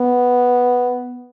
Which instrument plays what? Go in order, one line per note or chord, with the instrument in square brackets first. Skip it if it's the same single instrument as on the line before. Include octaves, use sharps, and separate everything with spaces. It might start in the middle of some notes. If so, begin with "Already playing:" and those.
Already playing: [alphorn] B3